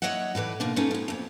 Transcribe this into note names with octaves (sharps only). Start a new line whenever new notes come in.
D#2 F#3 C#5 D#5 E5 F#5
A2 E3 B4 D5
B2 D3 A#3 D#4
A3 B3 C#4 D#4 F4
A2 F3
F2 A#2